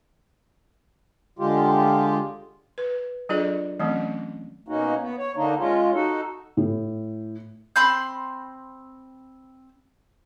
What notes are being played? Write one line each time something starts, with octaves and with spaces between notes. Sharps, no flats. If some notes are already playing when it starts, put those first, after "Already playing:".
D3 G#3 F4 G4
B4
F#3 D4 F4 G#4 A4 D5
E3 F#3 A3 C4 C#4
B2 A#3 C#4 D#4 F#4
B3
C#5
D3 A#3 D4 D#4
G#3 C#4 F4
D#4 F#4 A4
A2
C4 B5 C6 G6